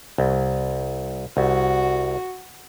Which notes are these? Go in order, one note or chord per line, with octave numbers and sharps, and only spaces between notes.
C2
C2 F#4